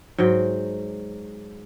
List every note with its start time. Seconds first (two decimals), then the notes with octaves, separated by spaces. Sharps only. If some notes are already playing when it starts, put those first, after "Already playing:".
0.18 G#2 F#3 G5